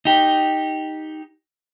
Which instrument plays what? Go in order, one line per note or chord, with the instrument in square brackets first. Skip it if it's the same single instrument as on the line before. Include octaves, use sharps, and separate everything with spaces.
[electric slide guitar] D#4 G4